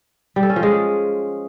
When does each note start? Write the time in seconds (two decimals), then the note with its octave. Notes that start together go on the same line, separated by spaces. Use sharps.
0.36 G3
0.43 A4
0.49 C#4
0.56 F3
0.63 G#3